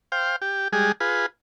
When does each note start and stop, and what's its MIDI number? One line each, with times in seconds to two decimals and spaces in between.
0.12 0.36 72
0.12 0.36 77
0.12 0.36 79
0.42 0.68 67
0.73 0.92 55
0.73 0.92 56
0.73 0.92 68
1.00 1.26 65
1.00 1.26 68
1.00 1.26 71